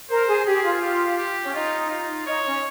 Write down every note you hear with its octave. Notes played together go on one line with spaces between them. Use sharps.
A#4 C5
G#4
G4 G#4
F4
G4
G4
C#4
D#4 F4
F4
D#4 C#5
C#4